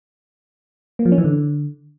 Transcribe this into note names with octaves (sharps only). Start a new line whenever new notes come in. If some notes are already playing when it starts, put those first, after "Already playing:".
A#3
F3
C#4
E3
D3